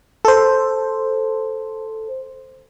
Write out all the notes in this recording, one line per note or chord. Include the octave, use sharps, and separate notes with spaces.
A4 C5